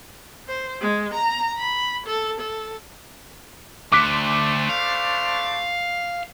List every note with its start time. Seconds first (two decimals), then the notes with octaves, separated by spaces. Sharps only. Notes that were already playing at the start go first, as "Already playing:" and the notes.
0.48 C5
0.81 G#3
1.14 A#5
1.57 B5
2.07 A4
2.40 A4
3.92 D2 A3 D4 C5 D6 F#6 B6
4.69 F5